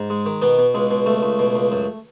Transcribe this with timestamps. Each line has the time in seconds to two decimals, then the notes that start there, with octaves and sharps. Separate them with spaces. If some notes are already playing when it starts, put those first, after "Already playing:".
Already playing: G#2
0.10 G#3
0.26 D#3
0.42 B2 B3
0.59 B2
0.75 C#2 G#3
0.91 B2
1.06 C#2 A3
1.23 C#2
1.39 B2
1.55 C#2
1.72 F#2